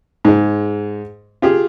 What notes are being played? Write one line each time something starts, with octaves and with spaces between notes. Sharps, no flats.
G#2 G#3
F4 G4 G#4